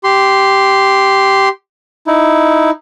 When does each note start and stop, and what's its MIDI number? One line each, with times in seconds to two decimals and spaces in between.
0.04 1.49 67
0.04 1.49 84
2.07 2.70 63
2.07 2.70 64